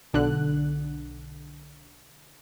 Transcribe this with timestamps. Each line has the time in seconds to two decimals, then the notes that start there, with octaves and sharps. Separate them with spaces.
0.13 B1 D3 F#6